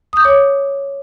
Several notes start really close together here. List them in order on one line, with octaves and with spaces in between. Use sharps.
D#6 G6 D6 C#5